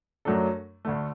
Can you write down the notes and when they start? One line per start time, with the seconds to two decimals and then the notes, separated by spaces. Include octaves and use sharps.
0.25 F#2 F#3 A3 D4 A4
0.85 D2 D3 A3